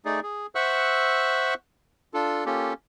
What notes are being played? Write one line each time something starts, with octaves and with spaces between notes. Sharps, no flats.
A3 D#4 G#4 D5
G#4
C5 E5 F#5 C#6 E6 F#6
D4 F4 A4
A#3 C#4 F4 G4 A4